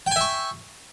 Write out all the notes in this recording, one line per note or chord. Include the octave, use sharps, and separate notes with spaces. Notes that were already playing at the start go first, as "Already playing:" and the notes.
E5 G5 G#5 C#6